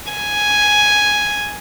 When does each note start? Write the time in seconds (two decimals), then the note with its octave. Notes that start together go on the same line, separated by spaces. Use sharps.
0.13 G#5